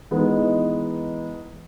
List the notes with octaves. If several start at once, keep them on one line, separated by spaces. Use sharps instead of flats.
E3 G#3 B3 D#4